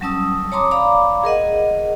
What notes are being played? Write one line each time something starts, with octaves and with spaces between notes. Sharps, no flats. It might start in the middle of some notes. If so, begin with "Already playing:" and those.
F#3 G3 C#4 A5 D#6 E6
C#5 A5 A#5 C6 D6 D#6
D5 F5 A#5 B5 D6
G#4 A#4 D#5 F#5